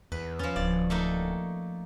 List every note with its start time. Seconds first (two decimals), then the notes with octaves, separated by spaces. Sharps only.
0.12 E2 B4
0.39 F3 C#4 A6
0.56 D1 F3 D5
0.90 A3 A#3 D#4